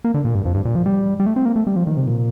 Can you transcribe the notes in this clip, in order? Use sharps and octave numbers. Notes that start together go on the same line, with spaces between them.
A#3
D3
A#2
G2
F2
G2
A#2
F3
G3
G3
A3
C4
A#3
A3
G3
F3
D#3
C3
A#2